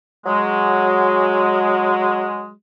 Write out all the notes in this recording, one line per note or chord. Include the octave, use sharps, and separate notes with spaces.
F#3 G#3